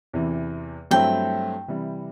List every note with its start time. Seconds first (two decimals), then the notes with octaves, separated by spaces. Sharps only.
0.13 E2 C3 E3
0.91 G2 F#3 A3 C4 E4 G5
1.68 C3 E3 G3